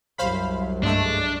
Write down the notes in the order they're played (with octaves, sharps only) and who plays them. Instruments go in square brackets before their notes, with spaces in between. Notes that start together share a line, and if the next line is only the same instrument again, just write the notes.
[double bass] C2 F#2 [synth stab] C5 F5 B5
[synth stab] G2 G#3 A3 [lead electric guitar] D4